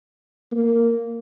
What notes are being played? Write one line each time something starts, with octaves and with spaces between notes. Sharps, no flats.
A#3